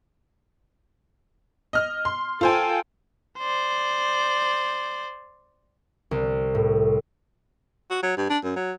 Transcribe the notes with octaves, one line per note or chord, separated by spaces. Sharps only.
D#5 F6
C6
F4 A4 C5 G5 G#5
C5 D5
C2
A2
F#4
F#3
G2
D4
F#2
F#3